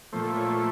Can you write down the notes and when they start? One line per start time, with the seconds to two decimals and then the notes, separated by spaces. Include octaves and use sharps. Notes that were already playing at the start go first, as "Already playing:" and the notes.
0.13 A#2 F3 A3 C5
0.36 C#5